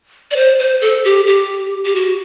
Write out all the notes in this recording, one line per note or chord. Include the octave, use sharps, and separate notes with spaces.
D5
C5
C5
A4
G4
G4
G4
F#4